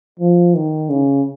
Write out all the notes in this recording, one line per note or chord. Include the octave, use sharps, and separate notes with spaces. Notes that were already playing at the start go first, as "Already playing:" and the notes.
F3
D#3
C#3